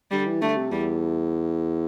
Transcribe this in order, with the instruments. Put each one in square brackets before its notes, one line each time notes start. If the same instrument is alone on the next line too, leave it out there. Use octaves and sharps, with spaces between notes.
[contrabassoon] D3 [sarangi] G3
[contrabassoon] E3
[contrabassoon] D3 [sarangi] A3
[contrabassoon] C3
[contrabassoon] E2 [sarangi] G3